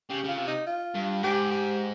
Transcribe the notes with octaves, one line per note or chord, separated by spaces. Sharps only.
C#3 G4
C#3 F4
C3
D#4
F4
G2
G#2 G4
G4